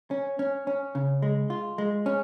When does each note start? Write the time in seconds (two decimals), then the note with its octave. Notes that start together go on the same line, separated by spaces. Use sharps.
0.11 C#4
0.39 C#4
0.67 C#4
0.95 C#3
1.22 G#3
1.50 F4
1.78 G#3
2.06 C#4